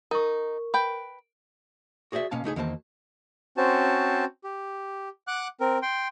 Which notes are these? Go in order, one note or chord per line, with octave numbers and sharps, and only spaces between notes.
D#4 A#4 C#6
B4 G5
F#4 G#4 C5 D5 E5
B2 A#3 C#4 F5 A5
C#2 A3 D#4 G#4
E2 D#3 A#3 F#4 C5 A5
C4 C#4 F#4 C5 A5
G4
F#5 D6 F#6
C4 A#4
G5 C6